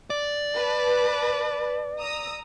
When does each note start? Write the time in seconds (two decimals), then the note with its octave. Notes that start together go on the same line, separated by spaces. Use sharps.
0.10 D5
0.54 B4 A5
1.99 A#5 D#6 E6